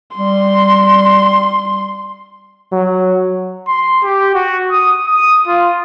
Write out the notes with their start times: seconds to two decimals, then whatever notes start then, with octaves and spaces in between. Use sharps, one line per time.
0.17 G3 C6
2.72 F#3
3.67 C6
4.03 G4
4.34 F#4
4.71 D#6
5.07 D#6
5.48 F4